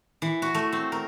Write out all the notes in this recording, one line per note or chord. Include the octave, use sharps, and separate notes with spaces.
E3
F#4
A3
C4
A#4